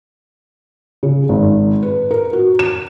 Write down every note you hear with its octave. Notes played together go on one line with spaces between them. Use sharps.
C#3
G#1
B4
A#4
F#4
E7